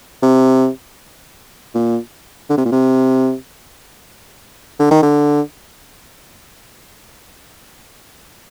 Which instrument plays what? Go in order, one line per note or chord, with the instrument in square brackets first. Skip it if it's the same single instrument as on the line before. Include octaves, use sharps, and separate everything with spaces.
[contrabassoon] C3
A#2
D3
C3
A#2
C3
D3
D#3
D3